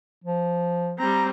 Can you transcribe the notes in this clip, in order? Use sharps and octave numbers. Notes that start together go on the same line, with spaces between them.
F3
G3 C4 A#5